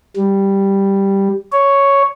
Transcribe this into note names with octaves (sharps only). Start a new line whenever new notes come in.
G3
C#5